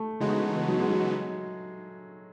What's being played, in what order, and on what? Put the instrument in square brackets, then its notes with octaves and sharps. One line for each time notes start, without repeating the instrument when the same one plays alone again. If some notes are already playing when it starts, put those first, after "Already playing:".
Already playing: [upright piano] A3
[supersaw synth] C#3 E3 B3 D#4 F#4 [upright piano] G#3
[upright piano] F#3
G#3
F#3